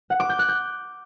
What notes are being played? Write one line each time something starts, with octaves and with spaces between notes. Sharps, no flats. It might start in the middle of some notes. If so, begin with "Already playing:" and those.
F#5
D6
G6
F#6
G6